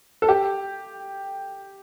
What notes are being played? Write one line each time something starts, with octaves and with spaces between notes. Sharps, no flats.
A4
G4